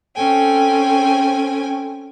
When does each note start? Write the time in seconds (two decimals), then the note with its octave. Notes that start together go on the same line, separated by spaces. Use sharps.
0.15 C4 C#4 A4 G5 G#5